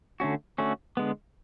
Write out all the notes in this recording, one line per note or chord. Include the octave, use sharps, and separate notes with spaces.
D3 A3 C#4 F#4
D3 A3 C#4 F#4
D3 G#3 B3